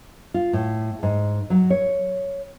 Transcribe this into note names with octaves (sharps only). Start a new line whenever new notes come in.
F4
A2
G#2
F#3
C#5